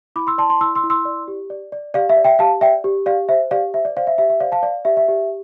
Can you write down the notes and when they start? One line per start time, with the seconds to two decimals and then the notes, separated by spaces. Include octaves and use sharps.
0.16 E4 B5 D6
0.27 C6 E6
0.38 D5 A5 C6
0.50 A5 C6
0.61 E4 C6 E6
0.75 C6 E6
0.84 E4
0.90 C6 E6
1.05 D5
1.28 G4
1.50 D5
1.72 D5
1.94 G4 D5 F5
2.09 E5
2.17 D5
2.24 E5 G5
2.39 G4 F5 A5
2.61 D5 E5 G5
2.84 G4
3.06 G4 D5 F5
3.29 C5 E5
3.51 G4 D5 F5
3.73 C5 E5
3.85 D5
3.96 C5 D5 F5
4.07 E5
4.18 G4 E5
4.30 E5
4.40 C5 D5 F5
4.52 F5 A5
4.62 D5 F5
4.85 G4 E5
4.97 E5
5.08 G4